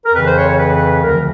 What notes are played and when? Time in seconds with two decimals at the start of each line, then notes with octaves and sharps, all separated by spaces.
0.05 A#4
0.13 F2 C#3 E3 B4
0.25 C5
0.36 C#5
0.47 C#5
0.59 B4
0.73 B4
0.88 B4
1.03 D2 D3 F3 A#4